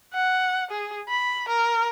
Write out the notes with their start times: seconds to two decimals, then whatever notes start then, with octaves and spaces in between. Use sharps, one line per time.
0.14 F#5
0.70 G#4
1.09 B5
1.48 A#4